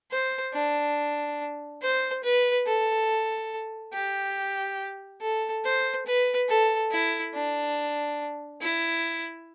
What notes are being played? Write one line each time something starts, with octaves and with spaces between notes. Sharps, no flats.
C5
D4
C5
B4
A4
G4
A4
C5
B4
A4
E4
D4
E4